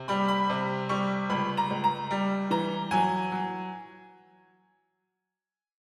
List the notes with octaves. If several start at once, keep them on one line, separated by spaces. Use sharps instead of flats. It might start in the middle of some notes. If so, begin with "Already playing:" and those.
Already playing: C3
G3 B5
B5
C3
G3 C#6
C#2 B5
A#5
C#2
A#5
G3
E3 A#5
F#3 G#5
F#3